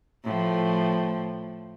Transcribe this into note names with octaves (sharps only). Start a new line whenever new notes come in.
A2 F3